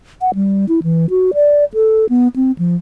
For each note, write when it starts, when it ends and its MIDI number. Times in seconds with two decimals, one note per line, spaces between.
0.21 0.31 78
0.35 0.65 55
0.69 0.80 64
0.83 1.06 52
1.10 1.31 66
1.34 1.65 74
1.74 2.09 69
2.09 2.28 59
2.36 2.52 60
2.59 2.76 53